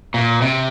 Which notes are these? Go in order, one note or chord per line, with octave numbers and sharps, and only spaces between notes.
A#2
C3